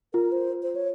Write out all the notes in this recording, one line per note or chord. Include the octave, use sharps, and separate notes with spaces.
F4 A#4
C5
C5
C#5